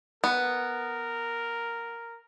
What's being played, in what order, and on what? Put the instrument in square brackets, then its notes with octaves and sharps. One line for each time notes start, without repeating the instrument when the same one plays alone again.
[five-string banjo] B3 [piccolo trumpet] A#4